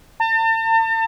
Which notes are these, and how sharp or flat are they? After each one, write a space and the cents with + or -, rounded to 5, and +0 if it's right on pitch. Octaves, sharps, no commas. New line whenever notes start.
A5 +40